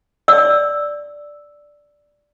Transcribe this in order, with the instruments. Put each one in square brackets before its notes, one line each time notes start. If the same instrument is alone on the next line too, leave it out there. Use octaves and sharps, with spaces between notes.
[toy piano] D5 E6